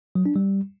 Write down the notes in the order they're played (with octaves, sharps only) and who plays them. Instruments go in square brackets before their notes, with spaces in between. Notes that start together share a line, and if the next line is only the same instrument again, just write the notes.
[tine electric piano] F#3
D4
G3